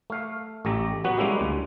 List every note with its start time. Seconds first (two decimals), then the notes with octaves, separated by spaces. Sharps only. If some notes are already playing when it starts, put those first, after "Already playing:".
0.10 A3 F5
0.65 A1 A3 G4 A#5
1.04 F#3 B3 F#4 B4
1.17 G3 G#3 A#3 C#4 E4 G4
1.40 D2